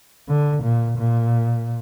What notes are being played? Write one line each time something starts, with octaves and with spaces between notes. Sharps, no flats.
D3
A#2
A#2